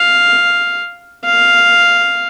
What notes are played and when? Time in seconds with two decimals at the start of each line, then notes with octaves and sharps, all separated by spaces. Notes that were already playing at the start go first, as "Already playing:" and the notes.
Already playing: F5
1.25 F5